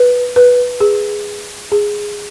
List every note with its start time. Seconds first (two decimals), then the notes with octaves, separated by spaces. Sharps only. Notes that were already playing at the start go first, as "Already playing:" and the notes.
Already playing: B4
0.36 B4
0.80 G#4
1.72 G#4